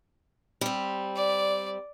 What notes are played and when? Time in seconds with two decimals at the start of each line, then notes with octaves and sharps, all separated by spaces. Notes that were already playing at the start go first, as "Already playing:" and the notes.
0.61 G3 C4
1.16 D5